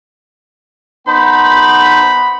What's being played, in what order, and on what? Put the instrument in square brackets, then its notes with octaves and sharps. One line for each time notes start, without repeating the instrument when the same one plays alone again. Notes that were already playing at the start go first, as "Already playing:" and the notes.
[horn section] B3 F#5 B5 [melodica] D#4 C5